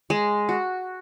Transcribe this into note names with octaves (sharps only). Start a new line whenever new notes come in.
G#3
F#4